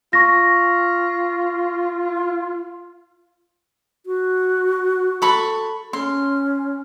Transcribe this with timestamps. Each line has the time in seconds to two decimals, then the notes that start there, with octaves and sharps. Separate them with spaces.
0.13 F4 C#6 A#6
4.06 F#4
5.22 A4 B5 C#6
5.93 C#4 C6